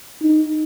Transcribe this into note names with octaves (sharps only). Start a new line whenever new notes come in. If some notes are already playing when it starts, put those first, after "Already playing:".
D#4